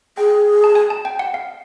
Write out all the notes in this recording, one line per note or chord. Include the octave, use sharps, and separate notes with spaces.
G#4 G5
A5
G#5
A5
G5
F#5
F5